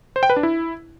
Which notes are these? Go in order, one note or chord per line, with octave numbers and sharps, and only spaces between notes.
C5
G5
B4
D4
E4